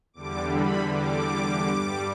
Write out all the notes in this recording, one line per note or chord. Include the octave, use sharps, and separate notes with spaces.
E2 D3 G3 D6
B5
D6
G2 G3